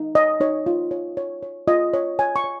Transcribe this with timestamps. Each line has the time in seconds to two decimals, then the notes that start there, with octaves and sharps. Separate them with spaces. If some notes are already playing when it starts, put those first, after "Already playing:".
Already playing: D#4
0.15 C#5 D#5
0.40 D#4 C#5
0.66 F4
0.91 C#5
1.17 C#5
1.43 C#5
1.67 F4 D#5
1.94 C#5
2.19 C#5 G#5
2.36 C#6
2.44 C#5